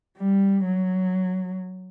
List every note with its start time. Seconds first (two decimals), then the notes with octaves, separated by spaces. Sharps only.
0.18 G3
0.65 F#3